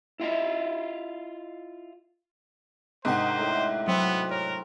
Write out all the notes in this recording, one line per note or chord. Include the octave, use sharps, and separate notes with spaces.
E4 F4 D#5 E5
G#2 C3 D#3 D4 C5 D#5 F#5
A2
F#3 B3 C4
A#4 C#5